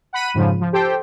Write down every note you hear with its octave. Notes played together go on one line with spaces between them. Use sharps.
F#5 B5 D#7
F2 G#2 C#3 F3
F3
G4 A4 C5 G5